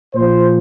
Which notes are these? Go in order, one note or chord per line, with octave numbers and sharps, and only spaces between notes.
A#2 F3 C5